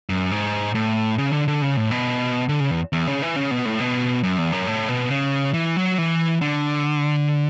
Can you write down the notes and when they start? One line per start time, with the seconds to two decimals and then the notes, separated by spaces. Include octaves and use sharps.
0.09 F#2
0.31 G#2
0.75 A2
1.18 C#3
1.33 D3
1.48 D3
1.62 C#3
1.77 A2
1.91 B2
2.49 D3
2.60 C#3
2.71 E2
2.93 E2
3.07 C#3
3.22 E3
3.36 C#3
3.51 B2
3.65 A2
3.80 B2
4.23 F#2
4.38 E2
4.52 F#2
4.67 A2
4.89 B2
5.11 C#3
5.54 E3
5.77 F#3
5.98 E3
6.41 D3